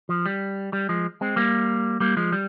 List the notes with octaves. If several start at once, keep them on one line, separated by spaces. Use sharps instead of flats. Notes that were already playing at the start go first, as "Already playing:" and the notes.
F3
G3
G3
F3 G#3
G#3 C4
G3 A#3
G3 A#3
F3 G#3
G3